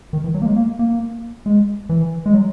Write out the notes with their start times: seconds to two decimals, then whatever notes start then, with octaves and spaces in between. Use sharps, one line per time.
0.13 D#3
0.24 E3
0.34 F#3
0.42 A#3
0.46 G#3
0.56 A#3
0.79 A#3
1.46 G#3
1.89 E3
2.26 G#3
2.34 F#3